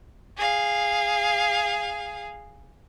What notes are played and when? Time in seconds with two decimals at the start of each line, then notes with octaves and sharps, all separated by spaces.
0.37 G#4 F5